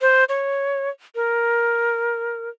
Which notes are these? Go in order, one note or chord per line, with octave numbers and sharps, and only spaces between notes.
C5
C#5
A#4